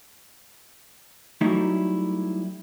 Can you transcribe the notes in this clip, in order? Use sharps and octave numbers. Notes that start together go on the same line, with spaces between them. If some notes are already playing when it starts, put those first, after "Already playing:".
F#3 G3 A3 D#4 E4